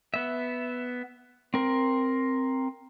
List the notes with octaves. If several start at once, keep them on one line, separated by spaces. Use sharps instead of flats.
B3 E5
C4 A#4